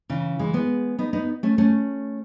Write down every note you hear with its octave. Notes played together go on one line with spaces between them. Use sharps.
C#3 E3
E3 G#3
G#3 B3
B3 D#4
B3 D#4
A3 C#4
A3 C#4